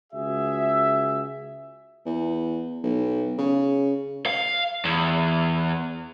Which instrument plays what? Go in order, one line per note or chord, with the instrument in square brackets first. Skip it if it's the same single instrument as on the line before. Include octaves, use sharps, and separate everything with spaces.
[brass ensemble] C#2 F#4 G#4 E5
[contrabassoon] E2
B1
C#3
[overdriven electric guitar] F5
E2